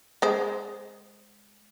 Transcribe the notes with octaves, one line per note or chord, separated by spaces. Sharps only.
G#3 C5